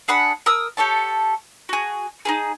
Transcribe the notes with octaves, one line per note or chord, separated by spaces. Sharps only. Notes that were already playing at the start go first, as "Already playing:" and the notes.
D4 G#4 F#5 B5
A#4 D#6 E6
G4 A4 C#5 A5
F#4 G#4
D#4 E4 G#4